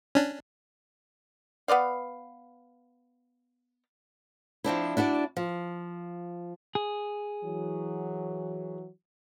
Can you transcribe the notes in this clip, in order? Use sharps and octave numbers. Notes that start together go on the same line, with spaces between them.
C#4 D4
B3 B4 D5 F5
F3 C4 D4 E4
D4 E4 F#4 D5
F3
G#4
E3 F#3